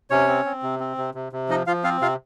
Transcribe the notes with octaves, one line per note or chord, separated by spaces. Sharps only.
C3 C#4 C#5
C4
C4
C3
C4
C3
C3
C3
F3 D#4 D#5
F3 F4 F5
C4 F4 F5
C3 F4 F5